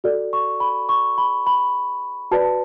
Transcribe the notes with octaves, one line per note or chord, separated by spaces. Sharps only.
F#4 A4 D5
C#6
B5
C#6
B5
B5
F#4 B4 D5 A5